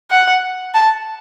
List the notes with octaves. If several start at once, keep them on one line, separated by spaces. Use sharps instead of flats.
F#5
A5